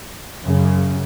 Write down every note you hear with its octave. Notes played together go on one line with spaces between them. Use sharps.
F#2 C#3